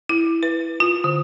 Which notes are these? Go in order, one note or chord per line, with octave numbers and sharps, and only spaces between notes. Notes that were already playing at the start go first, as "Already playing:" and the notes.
E4
B4
F4
D3